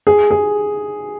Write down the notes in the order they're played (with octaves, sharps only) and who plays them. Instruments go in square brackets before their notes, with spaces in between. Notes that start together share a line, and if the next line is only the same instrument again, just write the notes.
[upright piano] G#4
G#4